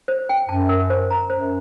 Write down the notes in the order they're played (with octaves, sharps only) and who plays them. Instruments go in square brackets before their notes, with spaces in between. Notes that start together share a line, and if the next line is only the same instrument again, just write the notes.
[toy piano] C5
G5
[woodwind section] F#2 [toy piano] A5
[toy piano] A#4
C5
A#5
[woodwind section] F#2 [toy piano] C5